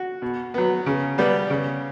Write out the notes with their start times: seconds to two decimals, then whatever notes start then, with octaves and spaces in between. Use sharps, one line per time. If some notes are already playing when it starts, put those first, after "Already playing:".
Already playing: F#4
0.22 B2
0.54 F#3 B3
0.86 C#3
1.18 G3 B3
1.50 C#3